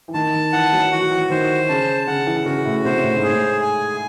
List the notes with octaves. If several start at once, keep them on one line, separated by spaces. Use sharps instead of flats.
E3
D#3 A5
D#3
E3 F#5
F#3
E3 F#4
F#3
E3
D#3 C5
C#3 A5
C#3 F#5
E3
C#3 F#4
A2
C3 C5
A2
G#2
G#4
A2
G#5